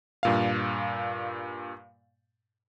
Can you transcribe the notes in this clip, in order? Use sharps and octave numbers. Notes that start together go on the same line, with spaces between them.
G2 A#2 F5